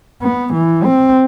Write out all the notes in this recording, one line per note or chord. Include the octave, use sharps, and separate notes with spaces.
B3
E3
C4